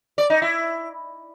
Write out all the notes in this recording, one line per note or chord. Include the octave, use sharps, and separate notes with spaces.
D5
D#4
E4